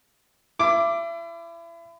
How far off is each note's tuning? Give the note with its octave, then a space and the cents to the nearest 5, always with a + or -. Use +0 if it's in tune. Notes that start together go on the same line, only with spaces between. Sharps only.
E4 +35 D6 +0